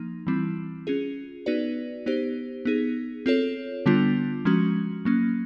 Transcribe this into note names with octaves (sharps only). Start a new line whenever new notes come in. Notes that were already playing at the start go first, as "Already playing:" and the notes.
Already playing: F3 A#3 D#4
E3 G3 C4 E4
C#4 F4 G#4
B3 D#4 F#4 B4 D5
B3 D#4 G4 C5
B3 D#4 G#4
C4 F4 A4 C#5
D3 G3 B3 D4 F4
F3 G#3 C#4 F#4
F#3 A#3 C#4